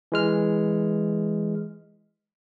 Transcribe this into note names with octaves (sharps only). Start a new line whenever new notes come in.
E3 G#3 F6